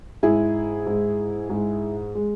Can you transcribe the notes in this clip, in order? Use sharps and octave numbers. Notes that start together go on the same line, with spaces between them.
G#2 G#3 E4 G#4
G#2 G#3
G#2 G#3
G#3